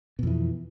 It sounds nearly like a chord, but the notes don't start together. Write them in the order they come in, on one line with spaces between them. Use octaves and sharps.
B2 F2 E3